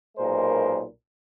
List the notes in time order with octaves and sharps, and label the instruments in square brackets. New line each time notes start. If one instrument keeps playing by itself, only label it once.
[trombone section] B1 A#2 G#3 A#4 C5